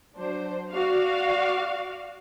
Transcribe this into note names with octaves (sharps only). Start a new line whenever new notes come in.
F#3 D4 C5
F#4 D5 F5